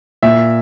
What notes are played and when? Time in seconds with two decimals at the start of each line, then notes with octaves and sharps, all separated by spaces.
0.23 A#2 E5